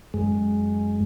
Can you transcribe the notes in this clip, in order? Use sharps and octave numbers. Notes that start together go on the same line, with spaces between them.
F#2 G#3